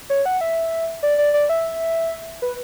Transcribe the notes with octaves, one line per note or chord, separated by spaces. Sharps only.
C#5
F#5
E5
D5
D5
D5
E5
B4